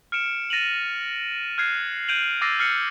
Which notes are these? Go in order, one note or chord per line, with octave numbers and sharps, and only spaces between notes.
F6 C#7 D7 E7
A6 A#6 D#7 F7 F#7
F6 F#6 G#6 C7
G6 D7 D#7 F7 F#7
D6 E6 A6 A#6 C7 D#7
F6 C7 C#7 F#7